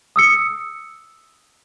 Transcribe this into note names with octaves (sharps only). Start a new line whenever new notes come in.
D#6 E6 C#7